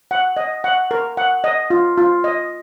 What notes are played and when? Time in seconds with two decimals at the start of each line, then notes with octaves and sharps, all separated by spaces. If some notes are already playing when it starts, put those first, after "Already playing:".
0.11 F#5
0.37 D#5
0.64 F#5
0.91 A#4
1.17 F#5
1.44 D#5
1.70 F4
1.98 F4
2.24 D#5